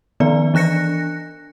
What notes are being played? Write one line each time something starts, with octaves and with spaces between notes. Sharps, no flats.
D#3 F3 B3 D5
E3 D4 F#6 A#6 C#7